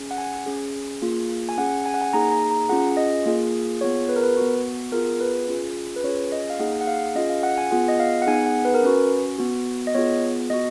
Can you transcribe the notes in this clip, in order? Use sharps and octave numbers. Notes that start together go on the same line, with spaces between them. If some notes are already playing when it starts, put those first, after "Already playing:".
Already playing: C#4 G#4
F#5
G#5
C#4 G#4
A#3 F4 G#4
G#5
C#4 G#4 F#5
G#5
F#5
G#5
A#3 D#4 G#4 A#5
A#5
A#5
C#4 F4 G#4 F#5
D#5
A#3 F4 G#4
B3 F4 G#4 C#5
B4
A#4
B4
B3 F#4
B3 F4 G#4 A#4
B4
C#4 F4 G#4
B4
C#4 F4 G#4 C#5
D#5
F5
A#3 D#4 G#4 F#5
F#5
F5
C#4 F4 G#4 D#5
F5
F#5
G#5
B3 F4 G#4 F#5
D#5
F5
F#5
B3 D#4 G#4 G#5
F#5
B4
A#4
C#4 F#4 B4
B3 F#4
D#5
B3 F4 G#4 C#5
B3 F#4 D#5